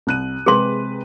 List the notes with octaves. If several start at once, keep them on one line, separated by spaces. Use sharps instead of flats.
C2 F#6 D#7
C3 G#3 G#4 B4 C6